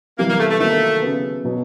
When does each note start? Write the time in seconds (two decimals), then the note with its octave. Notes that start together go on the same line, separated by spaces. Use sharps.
0.18 C3 E3 G3 A#3 B3
0.29 A#3
0.39 A3
0.50 A3
0.60 D#3 F#3 A3 A#3
1.02 C#3 F#3 B3
1.45 B2 F#3 B3